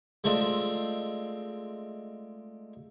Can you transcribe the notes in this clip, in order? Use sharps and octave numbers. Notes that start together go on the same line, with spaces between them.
G#3 A3 C4 D4 F4